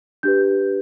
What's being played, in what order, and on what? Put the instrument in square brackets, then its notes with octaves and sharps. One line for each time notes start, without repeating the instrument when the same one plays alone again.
[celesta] D4 G4 B4 G6